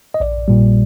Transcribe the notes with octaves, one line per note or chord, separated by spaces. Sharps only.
D#5
A#1 D5
A#2 G3